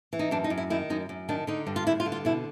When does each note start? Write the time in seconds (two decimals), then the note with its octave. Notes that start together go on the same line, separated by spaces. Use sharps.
0.13 E3
0.19 D#4
0.31 F#2 D4
0.44 D#4
0.50 F#2
0.58 E4
0.70 D#3 E4
0.90 F#2 D#4
1.09 F#2
1.29 D#3 D4
1.47 D3 D#4
1.67 G2
1.76 F4
1.87 G2 E4
2.00 F4
2.06 D3
2.12 F4
2.25 B2 E4